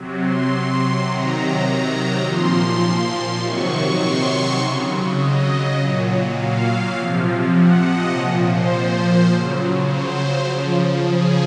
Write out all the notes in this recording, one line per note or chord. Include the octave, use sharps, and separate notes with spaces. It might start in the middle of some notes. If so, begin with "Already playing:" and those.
Already playing: C3 F#3
C6
C6
C3 D#3 F#3 A#5
A#2 F3 C6
C6
C3 D#3 F#3 C#6
C6
C#3 F#3
D#5
D#5
A#2 F#3
F5
C3 F3
F#5
D#5
A#2 F3 C#5
C5
C#3 F#3
C5
C#3 F3
G#4